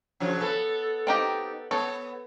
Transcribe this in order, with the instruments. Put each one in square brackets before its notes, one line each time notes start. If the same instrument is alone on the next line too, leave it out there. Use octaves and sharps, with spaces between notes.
[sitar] C#3 F3 F#3
B3 A4
[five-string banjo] C4 D#4 G4
[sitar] B3 [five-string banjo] A4 C#5